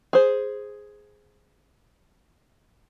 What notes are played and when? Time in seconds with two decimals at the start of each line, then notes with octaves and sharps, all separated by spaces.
0.13 G#4 C5